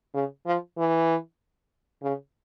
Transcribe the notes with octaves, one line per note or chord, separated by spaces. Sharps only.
C#3
F3
E3
C#3